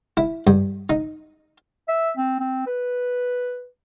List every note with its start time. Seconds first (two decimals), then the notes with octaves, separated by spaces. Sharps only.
0.17 E4
0.47 G2
0.90 D#4
1.88 E5
2.17 C4
2.40 C4
2.67 B4